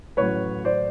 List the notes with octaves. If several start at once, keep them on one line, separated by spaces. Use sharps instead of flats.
A1 A2 F#3 B4 C#5
C5 D5